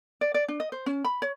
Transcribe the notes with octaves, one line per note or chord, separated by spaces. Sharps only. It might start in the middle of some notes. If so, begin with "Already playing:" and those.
D5
D5
D4
D#5
C5
C#4
B5
C#5